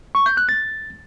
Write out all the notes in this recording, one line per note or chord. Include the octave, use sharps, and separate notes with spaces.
C#6
G6
F#6
A6